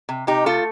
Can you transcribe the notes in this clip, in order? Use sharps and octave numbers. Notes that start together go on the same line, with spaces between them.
C3
C3 D#4 G4
A3 F4 A4